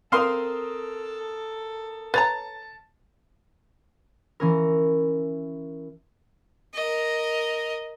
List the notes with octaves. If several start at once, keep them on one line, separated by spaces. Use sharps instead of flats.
C4 A4 A#4 F5 C6 D#6 F6
B4 C#5 A5 A#5 A6
E3 C#4 A#4
A#4 D#5